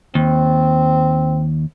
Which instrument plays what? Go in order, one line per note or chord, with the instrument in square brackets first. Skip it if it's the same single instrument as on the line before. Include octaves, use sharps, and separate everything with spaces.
[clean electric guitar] D#2 [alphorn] C4